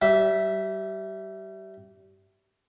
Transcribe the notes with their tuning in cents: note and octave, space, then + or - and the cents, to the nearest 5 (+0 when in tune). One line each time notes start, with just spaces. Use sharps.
G3 -30 E5 +0